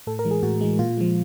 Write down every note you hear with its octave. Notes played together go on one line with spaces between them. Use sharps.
A2 A4
A#4
E3 G#3
G#4
A2 F#4
E3 G#3
A#2 F4
F3 G#3